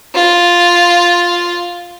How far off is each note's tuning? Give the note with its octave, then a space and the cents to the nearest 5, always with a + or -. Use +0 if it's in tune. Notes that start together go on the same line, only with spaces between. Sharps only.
F4 +0